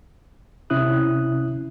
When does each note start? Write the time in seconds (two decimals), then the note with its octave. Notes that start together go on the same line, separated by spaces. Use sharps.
0.70 C3 C#4 E4 D#6 F#6